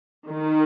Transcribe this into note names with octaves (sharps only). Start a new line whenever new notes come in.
D#3